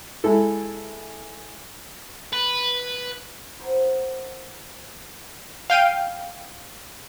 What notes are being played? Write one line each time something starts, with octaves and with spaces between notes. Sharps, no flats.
G#3 E4 A4
B4
E4 A#4 C5 F#5 A5 A#5
F5 G5 D#7